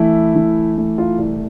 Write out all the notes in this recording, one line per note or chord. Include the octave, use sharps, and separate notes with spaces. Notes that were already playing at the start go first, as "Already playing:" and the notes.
Already playing: E3 A3 E4
E3
A3
F4
C2